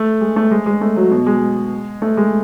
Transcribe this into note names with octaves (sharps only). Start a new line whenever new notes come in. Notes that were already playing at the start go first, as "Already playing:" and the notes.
Already playing: A3
G#3
A3
G#3
G#3
A3
F#3
B2
G#3
A3
G#3